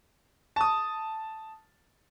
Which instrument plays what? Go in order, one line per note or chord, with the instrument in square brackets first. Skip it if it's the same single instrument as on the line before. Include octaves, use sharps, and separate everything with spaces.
[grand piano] A5 D#6